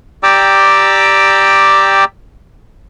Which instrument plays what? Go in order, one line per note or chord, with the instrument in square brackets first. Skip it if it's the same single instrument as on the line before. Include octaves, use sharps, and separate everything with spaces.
[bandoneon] G4 D5 G5 A#5 D6 E6